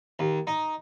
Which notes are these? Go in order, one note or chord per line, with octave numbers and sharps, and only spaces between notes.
D#2
D#4